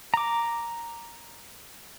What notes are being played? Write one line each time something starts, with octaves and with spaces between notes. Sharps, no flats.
A#5 D6